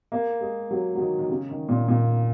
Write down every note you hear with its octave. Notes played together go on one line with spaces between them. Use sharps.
A#3
G#3
F#3
F#3
D#3
D#3
C#3
D#3
A#2
A#2